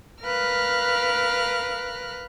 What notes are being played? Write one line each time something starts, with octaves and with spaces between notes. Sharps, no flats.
A#4 B4 F5 F6 F#6